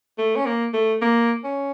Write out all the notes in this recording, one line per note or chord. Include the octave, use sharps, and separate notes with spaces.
A3
C#4
A#3
A3
A#3
C#4